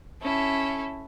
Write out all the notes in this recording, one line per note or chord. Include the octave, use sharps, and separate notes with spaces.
C#4 E4 A4